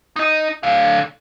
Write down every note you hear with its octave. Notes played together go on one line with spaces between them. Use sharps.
D#4 D#5
D3 F5